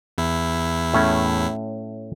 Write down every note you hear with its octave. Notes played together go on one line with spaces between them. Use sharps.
E2 E4
A2 A3 C#4